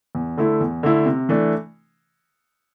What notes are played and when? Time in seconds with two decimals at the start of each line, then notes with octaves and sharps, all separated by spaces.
0.15 E2
0.37 D3 A3 E4
0.60 E2
0.83 D3 A3 E4
1.06 C3
1.29 E3 A3 D4